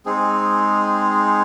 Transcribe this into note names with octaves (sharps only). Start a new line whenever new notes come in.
G#3 C4 D#4 G#4